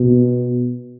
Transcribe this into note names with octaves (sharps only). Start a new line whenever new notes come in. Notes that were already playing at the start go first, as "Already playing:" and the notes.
Already playing: B2